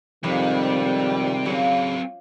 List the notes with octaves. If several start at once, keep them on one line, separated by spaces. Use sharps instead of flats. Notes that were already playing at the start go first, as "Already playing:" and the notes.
F2 G#2 C3 D#3 G3
C#3 F#3 C4